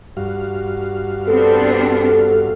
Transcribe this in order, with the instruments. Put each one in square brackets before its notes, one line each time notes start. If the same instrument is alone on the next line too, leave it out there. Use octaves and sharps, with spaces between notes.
[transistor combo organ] G2 F#4 F5
[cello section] B3 C4 D4 [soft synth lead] A4